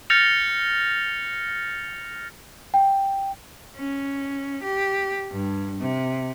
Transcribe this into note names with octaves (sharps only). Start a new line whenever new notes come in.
F6 G6 A6 A#6 C#7 F7
G5
C#4
G4
G2
C3